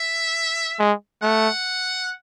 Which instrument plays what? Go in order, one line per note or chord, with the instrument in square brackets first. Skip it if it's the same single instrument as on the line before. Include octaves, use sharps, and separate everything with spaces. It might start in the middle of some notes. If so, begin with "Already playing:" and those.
Already playing: [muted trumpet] E5
[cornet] G#3
[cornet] A3 [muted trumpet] F#5